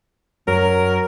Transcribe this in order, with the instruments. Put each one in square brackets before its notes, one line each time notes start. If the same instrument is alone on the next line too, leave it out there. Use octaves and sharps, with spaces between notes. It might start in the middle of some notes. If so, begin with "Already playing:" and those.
[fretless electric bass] F#2 [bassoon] F#3 [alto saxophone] A#4